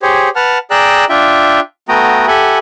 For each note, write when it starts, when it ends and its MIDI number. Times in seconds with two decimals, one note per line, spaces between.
0.02 0.29 67
0.02 0.29 68
0.02 0.29 72
0.02 0.29 73
0.36 0.58 71
0.36 0.58 78
0.36 0.58 81
0.36 0.58 89
0.71 1.05 68
0.71 1.05 74
0.71 1.05 79
0.71 1.05 82
0.71 1.05 88
0.71 1.05 90
1.09 1.60 62
1.09 1.60 65
1.09 1.60 76
1.09 1.60 79
1.89 2.26 57
1.89 2.26 59
1.89 2.26 66
1.89 2.26 79
1.89 2.26 82
1.89 2.26 87
2.27 2.58 67
2.27 2.58 69
2.27 2.58 76
2.27 2.58 78
2.27 2.58 80
2.27 2.58 83